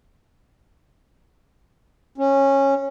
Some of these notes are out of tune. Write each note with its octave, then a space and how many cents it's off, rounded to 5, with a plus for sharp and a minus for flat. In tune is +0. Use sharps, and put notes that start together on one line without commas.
C#4 -15